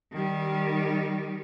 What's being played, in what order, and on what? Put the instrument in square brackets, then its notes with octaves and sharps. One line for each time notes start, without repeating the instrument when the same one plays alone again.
[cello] D#3 G3